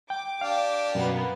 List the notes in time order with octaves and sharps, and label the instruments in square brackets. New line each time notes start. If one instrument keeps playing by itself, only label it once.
[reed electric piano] G5 [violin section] D6
[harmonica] D4 G4 [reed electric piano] F5
[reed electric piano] F#2 B2 [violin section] A#3 B3